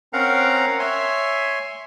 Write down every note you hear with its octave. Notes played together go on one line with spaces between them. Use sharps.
C4 C#4 A#4 F5 F#5 A#5
C#5 E5 G#5 C6